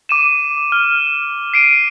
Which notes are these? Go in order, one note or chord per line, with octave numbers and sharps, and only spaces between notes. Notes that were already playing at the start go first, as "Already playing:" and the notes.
D6 D#7 E7
F6
C7 D7 D#7